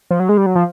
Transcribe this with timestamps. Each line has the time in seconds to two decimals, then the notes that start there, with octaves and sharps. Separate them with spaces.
0.11 F3
0.20 F#3
0.29 G#3
0.38 G3
0.46 F#3
0.55 F3